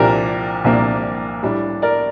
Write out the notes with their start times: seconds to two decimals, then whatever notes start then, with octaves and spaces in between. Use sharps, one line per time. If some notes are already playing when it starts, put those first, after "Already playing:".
Already playing: C2 A#2 F3 A#3 D4 G4 A#4
0.64 C2 A#2 F3 A#3 D4
1.43 A2 G3 D4
1.82 A#4 D5